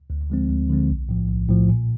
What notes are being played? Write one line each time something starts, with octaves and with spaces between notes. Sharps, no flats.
D2
D3 F3 G#3 C4
D2
D3 F3 G#3 C4
B1
A2 F3
B1
A2 F3
A#2